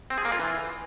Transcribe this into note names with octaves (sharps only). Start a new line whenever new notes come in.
C4
G#4
A#3
F4
E3